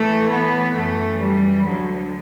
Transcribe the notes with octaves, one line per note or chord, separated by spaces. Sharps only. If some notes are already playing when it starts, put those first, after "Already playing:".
Already playing: A2 E3 A3
B3
F#2 E3 A3
G3
D2 D3 F#3